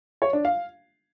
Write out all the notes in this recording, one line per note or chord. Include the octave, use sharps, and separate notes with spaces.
C#5
D4
F5